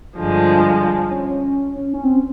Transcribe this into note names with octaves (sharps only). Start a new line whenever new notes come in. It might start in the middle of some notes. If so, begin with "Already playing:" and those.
G2 D3 F3 G#3
C#4
C#4
C4